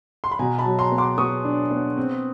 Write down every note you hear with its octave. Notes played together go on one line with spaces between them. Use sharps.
C6
B5
B2 G#5 A#5
A5 B5
F#3
A#5 C6
B3
C6 D6
B3 C#6 D#6
D4
B3
C4